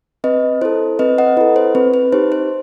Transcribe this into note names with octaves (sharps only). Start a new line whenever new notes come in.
C4 B4 D#5
E4 A4 C5
C4 B4 D#5
D#5 F#5
E4 A4 B4
C5
C4 B4
B4
D#4 G4 C5
C5